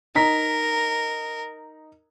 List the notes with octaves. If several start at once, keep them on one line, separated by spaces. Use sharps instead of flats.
D#4 A#4 A#5 B6